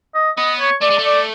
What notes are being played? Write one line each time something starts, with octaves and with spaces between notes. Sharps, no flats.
D#5
B3 D#5
C#5
A3 D5
G#3
A3
D5